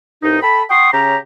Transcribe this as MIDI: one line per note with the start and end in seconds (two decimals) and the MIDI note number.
0.23 0.40 36
0.23 0.40 43
0.23 0.40 63
0.42 0.63 69
0.42 0.63 79
0.42 0.63 83
0.70 0.90 78
0.70 0.90 79
0.70 0.90 84
0.70 0.90 85
0.70 0.90 87
0.93 1.16 49
0.93 1.16 61
0.93 1.16 67
0.93 1.16 82